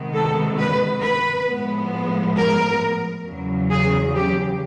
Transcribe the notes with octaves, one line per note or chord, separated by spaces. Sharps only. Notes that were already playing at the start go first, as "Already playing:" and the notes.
Already playing: C3 D#3 G#3 B3
A4
B4
B4
A2 F3 G#3 B3
A#4
E2 C#3 F#3
G#4
G4